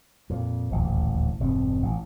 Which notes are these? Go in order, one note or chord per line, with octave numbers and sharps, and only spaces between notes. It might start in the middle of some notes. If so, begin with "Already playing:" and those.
F2 A#2
D#1 A1 D2
E1 G2 B2 C4
A1